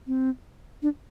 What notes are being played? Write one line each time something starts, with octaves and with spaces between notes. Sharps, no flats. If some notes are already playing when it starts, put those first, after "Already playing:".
C4
D4